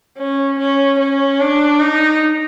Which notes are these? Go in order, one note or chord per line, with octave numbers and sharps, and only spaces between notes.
C#4
C#4
C#4
D4
D#4